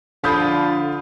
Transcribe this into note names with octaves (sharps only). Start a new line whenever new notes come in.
D3 F3 F4 B5 D#6 G6